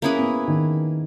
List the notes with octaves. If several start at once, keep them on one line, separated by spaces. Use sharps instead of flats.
A#3 C#4 E4 G#4 B4
B3
D#3